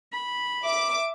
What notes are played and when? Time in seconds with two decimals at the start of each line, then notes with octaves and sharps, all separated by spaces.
0.12 B5
0.63 E5 D6